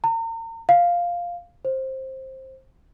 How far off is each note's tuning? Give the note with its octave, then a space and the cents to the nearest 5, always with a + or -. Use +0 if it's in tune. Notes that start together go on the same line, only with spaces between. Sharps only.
A#5 -40
F5 +0
C5 +15